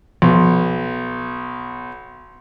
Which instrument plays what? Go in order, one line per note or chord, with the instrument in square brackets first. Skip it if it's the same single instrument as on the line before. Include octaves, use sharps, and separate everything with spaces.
[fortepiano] B1 [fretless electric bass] F3